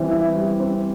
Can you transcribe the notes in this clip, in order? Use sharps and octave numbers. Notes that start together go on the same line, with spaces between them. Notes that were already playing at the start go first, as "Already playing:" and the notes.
Already playing: E3 G3 C4
E4
G3
C4